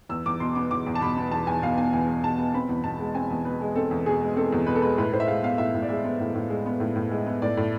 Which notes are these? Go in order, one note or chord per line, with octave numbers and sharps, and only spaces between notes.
E2 E6
E2 D6
B2 C6
B3 D6
E2 D6
E2
A5
B2 B5
B3
E2 A5
E2 G#5
B2 F5
B3 G#5
E2 G#5
E2
B2 A5
B3
C4 B5
E2
B2 A5
G#3
C4 G#5
E2
B2 B4
G#3
C4 A4
E2
B2 G#4
G#3
C4 A4
E2
B2 B4
A4
G#3 B4
A2 B4
A2 C5
E5
G#3 F5
B3 F5
A2 E5
A2
D5
G#3 E5
B3
A2
A2
G#3
B3
A2
A2
G#3
B3
A2 D5
A2